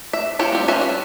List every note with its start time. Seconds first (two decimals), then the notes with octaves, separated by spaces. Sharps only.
0.13 E5
0.39 E4 F4 G4 C#5
0.52 G3 C4
0.68 C#4 F4 B4 C#5 E5
0.81 G3